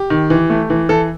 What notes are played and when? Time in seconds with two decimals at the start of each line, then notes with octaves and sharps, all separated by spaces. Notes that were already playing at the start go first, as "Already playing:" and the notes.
Already playing: G4
0.10 D#3
0.30 E3
0.50 A3
0.70 E3
0.89 E3 A4